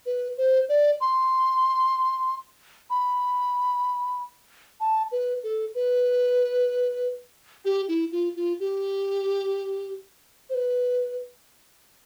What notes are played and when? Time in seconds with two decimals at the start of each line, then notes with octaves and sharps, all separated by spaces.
0.06 B4
0.38 C5
0.69 D5
1.01 C6
2.90 B5
4.80 A5
5.12 B4
5.43 A4
5.75 B4
7.65 G4
7.88 E4
8.12 F4
8.36 F4
8.60 G4
10.50 C5
10.55 B4